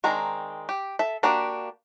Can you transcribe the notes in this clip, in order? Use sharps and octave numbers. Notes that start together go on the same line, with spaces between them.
D#3 G#3 C4 D4 A#5
G4
A4 E5
A#3 D4 F#4 G4